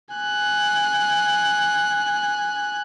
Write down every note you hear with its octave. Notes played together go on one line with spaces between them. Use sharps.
G#5 F#6